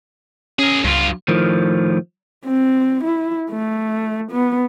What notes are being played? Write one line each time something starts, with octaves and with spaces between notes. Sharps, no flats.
C#4 G#4 A#4
C#2 G2 F4
A2 D#3 F3
C4
E4
A3
B3